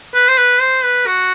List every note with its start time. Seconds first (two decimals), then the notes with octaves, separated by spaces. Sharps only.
0.14 B4
0.28 C5
0.38 B4
0.61 C5
0.84 B4
1.07 F#4